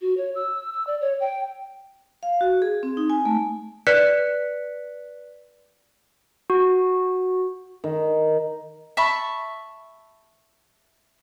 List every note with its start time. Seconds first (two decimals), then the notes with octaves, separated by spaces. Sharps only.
0.01 F#4
0.17 C#5
0.35 E6
0.73 E6
0.87 D5
1.01 C#5
1.20 G5
2.23 F5
2.41 F#4
2.62 G#4
2.83 C4
2.97 D#4
3.10 G#5
3.25 A3
3.87 B4 D5 F#6 B6 C#7
6.50 F#4
7.84 D#3
8.97 E5 A5 B5 C#6